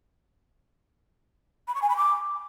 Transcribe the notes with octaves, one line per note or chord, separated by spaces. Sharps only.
B5
C#6
G#5
B5
D6